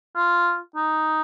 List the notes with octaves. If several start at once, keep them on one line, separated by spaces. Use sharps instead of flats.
F4
D#4